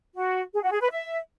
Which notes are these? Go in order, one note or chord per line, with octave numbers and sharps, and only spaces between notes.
F#4
G#4
F#4
G#4
B4
E5